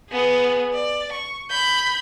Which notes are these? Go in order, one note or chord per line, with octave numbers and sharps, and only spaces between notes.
B3 G#4
D5
C#6
B5 G6